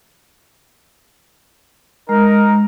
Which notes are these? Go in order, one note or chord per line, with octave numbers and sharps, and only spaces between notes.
G#3 D#4 A#4